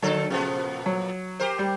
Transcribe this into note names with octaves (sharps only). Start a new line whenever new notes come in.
D3 F#3 A4
A#2 C#3 F3 B3
F#3
G4 A#4 C5
G3